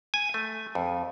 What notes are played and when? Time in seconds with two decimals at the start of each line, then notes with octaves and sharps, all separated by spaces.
0.14 G#5
0.34 A3
0.75 F2